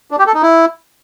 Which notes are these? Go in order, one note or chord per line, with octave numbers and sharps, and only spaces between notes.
D4
G4
A4
D#4
E4